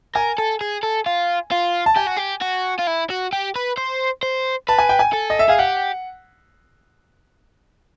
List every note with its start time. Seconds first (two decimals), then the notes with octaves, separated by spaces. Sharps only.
0.15 A#4 G#5
0.38 A4
0.61 G#4
0.83 A4
1.06 F4
1.52 F4
1.86 A5
1.97 G4 G#5
2.07 F#4
2.17 G4
2.42 F#4
2.79 F4
2.87 E4
3.10 F#4
3.33 G4
3.56 B4
3.77 C5
4.23 C5
4.69 B4 A5
4.79 G#5
4.89 G5
4.99 G#5
5.14 A4
5.30 D#5
5.39 E5
5.49 G#4 F5
5.59 G4 F#5